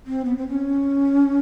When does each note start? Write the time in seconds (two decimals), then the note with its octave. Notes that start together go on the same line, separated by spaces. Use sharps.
0.06 C4
0.25 B3
0.37 C4
0.48 C#4